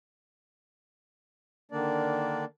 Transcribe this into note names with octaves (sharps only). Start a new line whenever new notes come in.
D3 D#3 A#3 D4 D5